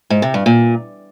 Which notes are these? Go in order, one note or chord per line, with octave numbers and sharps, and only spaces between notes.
G#2
C3
G2
A#2